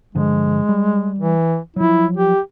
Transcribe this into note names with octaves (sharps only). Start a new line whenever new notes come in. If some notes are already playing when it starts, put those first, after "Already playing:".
G2 D3 F3 G#3
G3
E3
F3 F#3 E4
G4